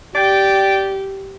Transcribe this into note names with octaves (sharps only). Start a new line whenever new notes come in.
G4 D5 G5